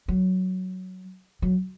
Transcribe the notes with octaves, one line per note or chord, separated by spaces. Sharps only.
F#3
F#3